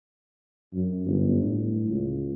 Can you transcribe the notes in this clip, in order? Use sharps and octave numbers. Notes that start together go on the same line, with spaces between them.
F#2
G1
A2
C#2